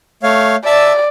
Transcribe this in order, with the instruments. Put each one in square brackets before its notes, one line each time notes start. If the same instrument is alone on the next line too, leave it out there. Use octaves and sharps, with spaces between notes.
[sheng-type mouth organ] A3 C#5 F5
[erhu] D5 [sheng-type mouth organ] E5 A5 E6